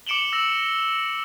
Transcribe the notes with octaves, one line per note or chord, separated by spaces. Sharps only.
D6 C#7 D7 E7 F#7 G7
E6 A#6 F#7